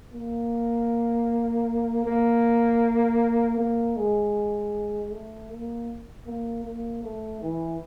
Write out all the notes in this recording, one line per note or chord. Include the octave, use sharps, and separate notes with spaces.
A#3
A#3
A#3
G#3
A3
A#3
A#3
A#3
A3
E3